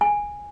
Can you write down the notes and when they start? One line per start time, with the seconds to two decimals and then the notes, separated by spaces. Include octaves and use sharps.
0.01 G#5